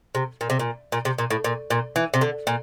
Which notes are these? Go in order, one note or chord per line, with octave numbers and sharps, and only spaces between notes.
C3
A#2
C3
A#2
A#2
C3
A#2
A2
A#2
A#2
E3
C3
D3
A#2